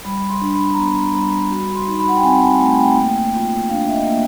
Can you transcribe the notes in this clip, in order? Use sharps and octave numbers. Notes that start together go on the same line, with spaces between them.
G3 B5
C6
D4
B5
A#5
B3 B5
G3 B5
F#4 B5
C6
D#4
B5
F#5
G5
C4 G#5
A5
A3 G#5
G5
A#3
F4
D4 F5
E5
D#5
A#3